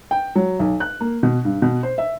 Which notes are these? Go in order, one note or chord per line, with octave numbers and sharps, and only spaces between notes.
G5
F#3
B1
F#6
A#3
B2
G2
B2
C5
E5